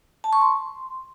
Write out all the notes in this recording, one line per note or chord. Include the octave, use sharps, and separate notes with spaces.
A5
C#6
C6